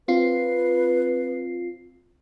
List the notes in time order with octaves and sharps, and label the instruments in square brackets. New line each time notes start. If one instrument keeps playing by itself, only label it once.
[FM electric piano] C4 F4 C7 [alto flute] B4